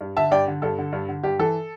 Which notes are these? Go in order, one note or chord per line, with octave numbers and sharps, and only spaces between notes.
G2
D3 E5 A5
G2 D5 G5
D3
G2 A4
D3
G2
D3
G2 G4
E3 A4